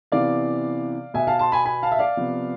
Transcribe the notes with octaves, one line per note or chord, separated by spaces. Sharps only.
C3 E3 B3 D5 F5
B2 B3 E5 G#5
F5 A5
A5 C6
G#5 B5
G#5 B5
F5 A5
E5
D5 F5
C3 F3 B3